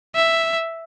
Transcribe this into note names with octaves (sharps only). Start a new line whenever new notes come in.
E5